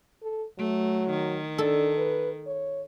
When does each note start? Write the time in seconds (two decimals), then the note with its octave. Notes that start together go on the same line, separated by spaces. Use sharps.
0.23 A4
0.58 F#3 A3
1.10 D#3
1.58 D4 A4
1.98 B4
2.47 C#5